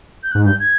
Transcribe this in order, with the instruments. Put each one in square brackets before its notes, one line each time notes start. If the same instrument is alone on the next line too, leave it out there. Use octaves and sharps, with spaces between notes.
[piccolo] G6
[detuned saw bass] G#2 [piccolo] F#6
[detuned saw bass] G2 [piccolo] G6
[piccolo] G#6